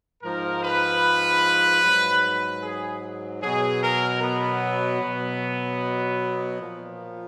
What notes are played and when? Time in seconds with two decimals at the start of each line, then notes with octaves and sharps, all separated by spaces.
0.22 G#2 F3 A#4
0.62 B4
1.82 G#2 F#3
2.63 G#4
3.42 B2 F#3 G#4
3.82 A#4
4.21 B3
5.01 B2 F#3
6.61 A#2 F3